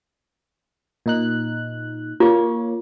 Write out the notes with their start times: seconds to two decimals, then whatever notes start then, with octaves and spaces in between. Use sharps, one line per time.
1.06 A#2 D#4 F#6
2.20 A#3 F4 C#5